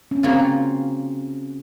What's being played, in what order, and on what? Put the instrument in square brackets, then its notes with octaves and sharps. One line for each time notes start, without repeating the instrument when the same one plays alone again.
[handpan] C#4
[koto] C#3 F#3 A#3 F4 [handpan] C4